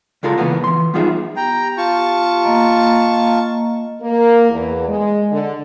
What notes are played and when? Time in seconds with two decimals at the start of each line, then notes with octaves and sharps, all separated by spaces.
0.23 C#2 G#3 F4 A4 A#4
0.38 C#3 E3 A#3 B3
0.64 E3 C6
0.94 G3 B3 D#4 F4 G#4 E5
1.36 B3 G4 G5 A#5
1.78 F4 A5 C#6
2.44 A#3 D#5 A#5
4.02 A#3
4.50 E2
4.88 G#3
5.32 D3